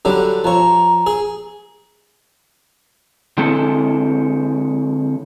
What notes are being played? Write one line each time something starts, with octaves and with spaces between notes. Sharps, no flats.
D3 F#3 G3
F3 C#5 A#5
G#4
D3 G#3 C4 E4 A4